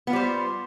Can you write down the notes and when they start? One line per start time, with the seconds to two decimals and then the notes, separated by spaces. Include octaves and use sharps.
0.07 B3
0.10 F4
0.13 G3
0.16 C5